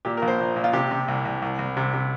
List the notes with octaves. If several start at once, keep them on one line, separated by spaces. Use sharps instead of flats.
A#2 G4
A#4
A#1
C5
A#2
A#2
F4
C3 G4
C3
C2
C2
C2
C2
C3
C3